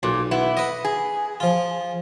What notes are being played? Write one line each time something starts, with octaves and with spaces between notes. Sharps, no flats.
B1 A#2
B3 E4
B4 D#5
G#4
F3 F4